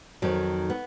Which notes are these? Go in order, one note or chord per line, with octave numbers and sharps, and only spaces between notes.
F2 D#3 F#3
B3